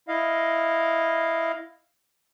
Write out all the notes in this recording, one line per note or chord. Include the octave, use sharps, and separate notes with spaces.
E4 D#5 F5